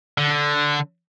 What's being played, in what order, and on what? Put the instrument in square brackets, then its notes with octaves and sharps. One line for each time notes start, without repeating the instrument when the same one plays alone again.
[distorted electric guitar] D3